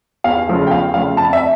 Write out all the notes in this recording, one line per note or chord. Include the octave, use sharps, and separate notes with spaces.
E2 F5
C#3 F3 A3
G5
E2 F5
C#3 F3 A3 F5
F2 A5
E5